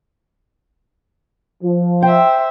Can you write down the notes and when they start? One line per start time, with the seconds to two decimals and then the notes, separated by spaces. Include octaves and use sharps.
1.63 F3
2.03 C5 E5 G5